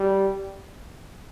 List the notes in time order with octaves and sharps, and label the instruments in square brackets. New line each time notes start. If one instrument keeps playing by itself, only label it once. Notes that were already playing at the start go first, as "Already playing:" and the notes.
Already playing: [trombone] G3